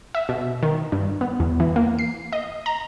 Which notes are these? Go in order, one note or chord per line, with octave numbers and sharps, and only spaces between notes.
E5
B2
D#3
G2
B3
E2
E3
A#3
C7
D#5
A#5